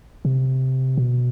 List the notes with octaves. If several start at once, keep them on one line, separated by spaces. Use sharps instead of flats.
C3
B2